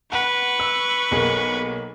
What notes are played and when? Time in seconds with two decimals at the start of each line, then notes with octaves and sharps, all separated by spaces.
0.12 B4 F#5 C#6
0.60 E6
1.11 B1 A#3 G#4